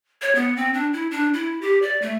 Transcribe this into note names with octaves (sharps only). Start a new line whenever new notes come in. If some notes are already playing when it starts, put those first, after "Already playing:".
C#5
B3
C4
D4
E4
D4
E4
G4
D5
A3